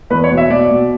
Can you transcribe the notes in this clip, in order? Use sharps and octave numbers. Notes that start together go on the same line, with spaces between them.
E2 B4
C#5
B2
E5
B2 D5
B2